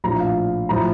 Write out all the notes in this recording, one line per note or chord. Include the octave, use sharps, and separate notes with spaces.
A#1 A2 F3 A#5
F5
A2 F3 A#5